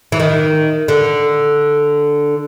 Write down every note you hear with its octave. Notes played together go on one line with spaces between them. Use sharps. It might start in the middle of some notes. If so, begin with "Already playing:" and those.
E3
D#3
D3